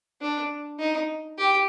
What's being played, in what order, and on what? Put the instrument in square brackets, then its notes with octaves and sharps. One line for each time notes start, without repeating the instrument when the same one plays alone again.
[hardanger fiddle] D4
D#4
G4